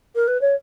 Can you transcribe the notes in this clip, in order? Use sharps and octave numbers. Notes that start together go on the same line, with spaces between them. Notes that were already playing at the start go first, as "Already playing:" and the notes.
A#4
B4
C#5